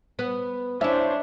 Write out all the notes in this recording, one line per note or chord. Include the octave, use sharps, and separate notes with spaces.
B3 B4
C#4 D4 E4 C5 E5